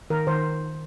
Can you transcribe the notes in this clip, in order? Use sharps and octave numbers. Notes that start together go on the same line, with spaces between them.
D#3 A#4
D#3 C5